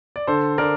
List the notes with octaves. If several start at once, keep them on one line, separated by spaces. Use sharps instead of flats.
D5
D3 A4 C5
D3 A#4 D5